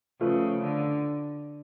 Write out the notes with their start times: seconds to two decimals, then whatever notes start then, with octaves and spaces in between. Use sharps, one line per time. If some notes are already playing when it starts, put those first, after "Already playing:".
0.21 C#3 F3 A3 F4 B4
0.62 D3